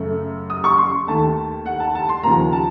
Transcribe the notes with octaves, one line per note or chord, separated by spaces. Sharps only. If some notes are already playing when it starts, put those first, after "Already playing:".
Already playing: F#2 C#3 A3
D#6
C#6
C6
D#2 D#3 A3 A5
F#5
A5
A5
C6
D#2 C#3 F3 A#3 A#5
A5